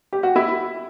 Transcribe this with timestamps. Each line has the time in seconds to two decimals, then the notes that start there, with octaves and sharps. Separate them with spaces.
0.13 G4
0.23 F#4
0.36 E4